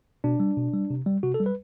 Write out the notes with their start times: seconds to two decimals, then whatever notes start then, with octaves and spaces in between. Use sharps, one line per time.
0.24 B2 D4
0.40 G3
0.57 B2
0.74 G3
0.90 C3
1.06 G3
1.23 C3 F#4
1.34 A4
1.40 G3
1.46 B4